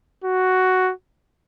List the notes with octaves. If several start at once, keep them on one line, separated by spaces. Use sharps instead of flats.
F#4